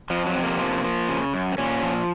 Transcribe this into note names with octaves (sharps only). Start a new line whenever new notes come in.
F2 F3
F#3
C3
A#3
F3
F3
C#3
F#2
C4
A#2 C#4
F3